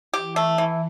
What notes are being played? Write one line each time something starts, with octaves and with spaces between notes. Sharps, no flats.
E3 G4
A3
E3